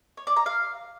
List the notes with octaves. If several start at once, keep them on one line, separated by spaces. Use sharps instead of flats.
C#5
D5
A#5
F5